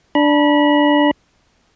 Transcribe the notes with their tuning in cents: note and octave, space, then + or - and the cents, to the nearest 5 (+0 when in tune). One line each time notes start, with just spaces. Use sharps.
D4 +0 B5 -30